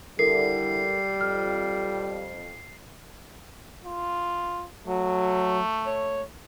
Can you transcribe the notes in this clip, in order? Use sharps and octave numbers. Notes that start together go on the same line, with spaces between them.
D3 G3 E4 A4 A#4 C7
F2 F6
F4
F#3 A3
C#5